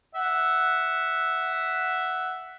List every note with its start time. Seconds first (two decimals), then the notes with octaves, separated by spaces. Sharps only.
0.15 E5 F#5